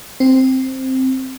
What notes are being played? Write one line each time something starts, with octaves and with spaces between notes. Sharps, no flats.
C4